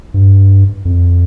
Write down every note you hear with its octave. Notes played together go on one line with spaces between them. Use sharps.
G2
F2